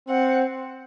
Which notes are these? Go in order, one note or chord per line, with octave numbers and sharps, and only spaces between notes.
C4 F#5